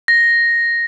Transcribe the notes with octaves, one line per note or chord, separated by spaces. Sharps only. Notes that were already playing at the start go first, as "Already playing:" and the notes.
A#6